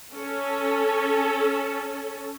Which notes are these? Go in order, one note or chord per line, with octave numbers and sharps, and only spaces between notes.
C#4 A4